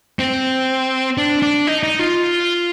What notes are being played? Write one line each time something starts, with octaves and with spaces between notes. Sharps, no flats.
C4
D4
D4
D#4
D#4
F4